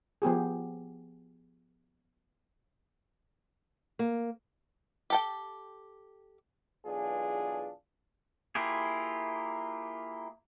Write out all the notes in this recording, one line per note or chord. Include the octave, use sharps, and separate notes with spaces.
F3 B3 G4 G#4
A#3
G4 A4 G5
B1 E2 D4 F4 G#4
A#3 E4 F4 G4 G#4